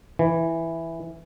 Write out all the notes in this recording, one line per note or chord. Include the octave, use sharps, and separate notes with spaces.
E3